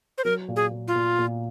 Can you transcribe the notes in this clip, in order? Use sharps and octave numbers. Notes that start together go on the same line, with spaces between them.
C5
F#3 A#4
A#2
G#4
A#2
F4
A#2
A#2